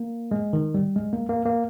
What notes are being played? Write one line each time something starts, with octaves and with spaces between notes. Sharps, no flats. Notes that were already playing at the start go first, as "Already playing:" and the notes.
Already playing: A#3
G#3
D#3
G3
G#3
A#3
A#3
A#3